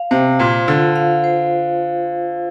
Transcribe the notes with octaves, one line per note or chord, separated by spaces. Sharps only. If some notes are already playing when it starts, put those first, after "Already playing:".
Already playing: F5
C3 C5
A#2 F4
D3 F4
F5
C5